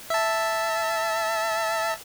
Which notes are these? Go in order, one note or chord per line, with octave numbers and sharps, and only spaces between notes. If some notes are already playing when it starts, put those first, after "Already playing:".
E5 A5